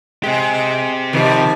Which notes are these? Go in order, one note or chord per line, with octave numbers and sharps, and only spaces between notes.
G#3 C4 G4
C3 D#3 F3 G3